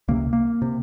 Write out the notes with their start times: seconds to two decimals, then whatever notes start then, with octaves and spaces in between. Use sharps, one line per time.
0.08 C#2 C3 A#3
0.33 A#3
0.62 C3